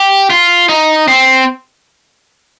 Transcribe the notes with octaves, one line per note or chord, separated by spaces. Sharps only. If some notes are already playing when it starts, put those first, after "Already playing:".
Already playing: G4
F4
D#4
C4